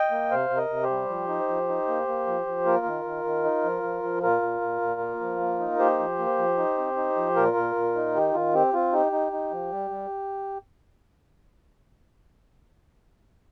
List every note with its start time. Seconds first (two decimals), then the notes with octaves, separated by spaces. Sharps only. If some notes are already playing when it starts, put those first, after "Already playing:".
Already playing: D#5 G5
0.11 A#3
0.31 C3 C5 F5
0.50 C3
0.57 A#4 D#5
0.70 C3
0.83 G4 C5
0.90 G3
1.09 F3
1.28 D#4
1.48 F3
1.68 D#4
1.88 A#3
2.07 A#3
2.27 F3
2.47 F3
2.65 A#3 F4 A#4
2.86 D#3
3.05 D#3
3.25 D#3
3.44 D#4
3.64 F3
3.83 F3
4.03 F3
4.23 A#2 F4 A#4
4.42 A#2
4.61 A#2
4.81 A#2
5.01 A#3
5.20 F3
5.40 A#3
5.59 D#4
5.79 A#3 G4 C5
5.99 F3
6.19 A#3
6.38 F3
6.58 D#4
6.78 C4
6.97 D#4
7.16 F3
7.36 A#2 F4 A#4
7.57 A#2
7.76 A#2
7.96 D#4
8.15 D#3 G4
8.34 D#3 F4
8.54 C4 G4
8.74 C4 F4
8.93 D#4 G4
9.12 D#4
9.32 D#4
9.51 F3
9.72 G3
9.91 G3